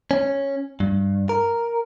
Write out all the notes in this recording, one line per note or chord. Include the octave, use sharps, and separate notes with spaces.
C#4
G2
A#4